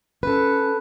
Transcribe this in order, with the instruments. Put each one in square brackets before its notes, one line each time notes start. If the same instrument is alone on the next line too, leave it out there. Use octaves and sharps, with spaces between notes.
[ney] C#4 [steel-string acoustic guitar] A4 B4